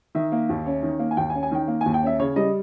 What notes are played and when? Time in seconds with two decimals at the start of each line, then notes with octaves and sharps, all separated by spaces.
0.15 D#3 E5
0.32 A#3
0.49 D#2
0.66 C#4
0.83 D#3
0.99 A#3
1.11 G#5
1.17 D#2 G5
1.30 G#5
1.34 C#4
1.43 G#5
1.51 D#3 G5
1.68 A#3
1.81 G#5
1.86 D#2
1.94 G5
2.03 C#4 E5
2.19 C#3 C#5
2.36 G3 D#5